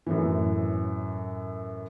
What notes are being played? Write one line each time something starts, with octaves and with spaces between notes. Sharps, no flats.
F#2 A2 E3